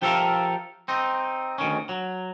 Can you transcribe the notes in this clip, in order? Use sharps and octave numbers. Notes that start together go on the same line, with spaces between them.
F3 G4 A4 A#4 E5 F5
C4 D#4
D2 D#3 C#4
F#3